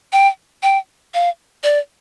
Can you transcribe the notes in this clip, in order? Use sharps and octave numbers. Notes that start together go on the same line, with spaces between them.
G5
G5
F5
D5